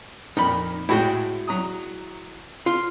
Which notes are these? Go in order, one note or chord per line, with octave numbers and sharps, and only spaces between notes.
F2 A#2 D#4 A#4 B5
A2 G#3 E4 F#4 G#4 G5
F#3 A#5 D#6
F4